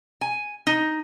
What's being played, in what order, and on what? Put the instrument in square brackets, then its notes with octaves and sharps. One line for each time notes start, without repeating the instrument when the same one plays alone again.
[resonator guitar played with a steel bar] G#5
D#4